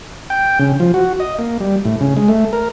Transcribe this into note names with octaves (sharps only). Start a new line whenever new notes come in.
G5
C#3
F3
F#4
D#5
A#3
G3
A2
C#3
G#3
A3
A#4